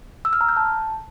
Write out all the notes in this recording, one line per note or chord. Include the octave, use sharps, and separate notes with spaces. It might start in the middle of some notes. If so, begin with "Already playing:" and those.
E6
F6
A#5
G6
A5